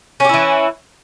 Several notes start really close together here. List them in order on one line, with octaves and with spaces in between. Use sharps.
C#4 G4 E4 E3